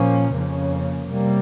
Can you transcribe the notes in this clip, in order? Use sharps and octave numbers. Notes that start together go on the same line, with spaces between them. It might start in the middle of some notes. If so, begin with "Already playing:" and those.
Already playing: A#2 F3 A#3 C#4
F2 C#3 F3 A#3 C#4
C3 G3 A#3